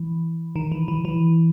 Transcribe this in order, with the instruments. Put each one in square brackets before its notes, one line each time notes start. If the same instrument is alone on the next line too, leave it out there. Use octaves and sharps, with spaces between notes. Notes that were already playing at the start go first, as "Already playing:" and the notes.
Already playing: [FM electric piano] E3
D#3
E3
E3
E3